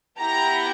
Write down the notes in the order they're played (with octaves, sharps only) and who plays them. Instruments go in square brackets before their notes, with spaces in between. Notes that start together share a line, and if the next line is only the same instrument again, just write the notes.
[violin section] B3 E4 G4 A#5